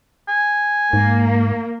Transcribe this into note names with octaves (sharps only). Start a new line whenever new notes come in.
G#5
G#2 A#3